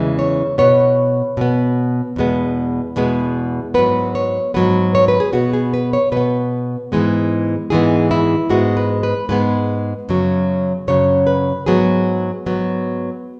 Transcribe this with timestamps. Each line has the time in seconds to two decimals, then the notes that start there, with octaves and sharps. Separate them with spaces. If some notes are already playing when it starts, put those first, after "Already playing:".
Already playing: E2 C#3 E3 G#3
0.19 C#5
0.58 B2 B3 C#5
1.37 B2 B3
2.16 E2 B2 G#3 B3
2.96 E2 B2 G#3 B3
3.74 G#2 F#3 B3 B4
4.15 C#5
4.54 G#2 F#3 B3 B4
4.95 C#5
5.08 B4
5.20 G#4
5.33 B2 B3 F#4
5.53 G#4
5.74 B4
5.93 C#5
6.12 B2 B3 B4
6.92 G#2 E3 G#3 B3
7.70 G#2 E3 G#3 B3 G#4
8.11 E4
8.50 G#2 G#3 B3 F#4
8.77 B4
9.03 B4
9.29 G#2 G#3 B3 B4
10.09 F#2 C#3 F#3
10.88 F#2 C#3 F#3 C#5
11.27 B4
11.66 G#2 F#3 B3 G#4
12.46 G#2 F#3 B3